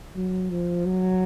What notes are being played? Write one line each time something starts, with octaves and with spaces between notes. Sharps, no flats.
F#3
F3
F#3